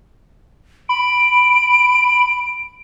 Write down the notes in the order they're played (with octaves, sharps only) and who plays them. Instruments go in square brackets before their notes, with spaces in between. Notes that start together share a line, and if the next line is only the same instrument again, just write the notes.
[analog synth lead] B5 [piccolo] D7